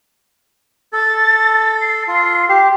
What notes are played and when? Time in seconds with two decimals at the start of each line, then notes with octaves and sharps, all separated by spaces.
0.93 A4 A6
1.81 C7
2.08 F4
2.49 G4